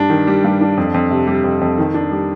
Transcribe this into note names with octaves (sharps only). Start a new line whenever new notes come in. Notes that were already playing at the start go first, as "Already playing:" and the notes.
Already playing: G2 D4
D#3
G3
G2
D4
F2
F2
C3
G3
F2
F2
D#3
D4
G3